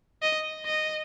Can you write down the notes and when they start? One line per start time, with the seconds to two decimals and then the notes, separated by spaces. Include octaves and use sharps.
0.22 D#5
0.66 D#5